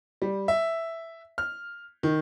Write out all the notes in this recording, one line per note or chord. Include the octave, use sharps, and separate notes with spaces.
G3
E5
F6
D#3